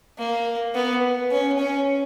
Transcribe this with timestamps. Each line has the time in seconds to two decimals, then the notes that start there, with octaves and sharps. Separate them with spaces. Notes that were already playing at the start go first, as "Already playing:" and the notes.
0.18 A#3
0.75 B3
1.31 C#4
1.59 C#4